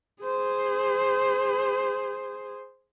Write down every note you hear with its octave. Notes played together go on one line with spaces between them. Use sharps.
G#4 C5